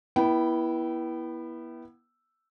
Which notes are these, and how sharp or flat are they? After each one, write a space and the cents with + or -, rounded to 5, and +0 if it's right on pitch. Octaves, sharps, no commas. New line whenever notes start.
B3 -30 E4 +0 G5 -30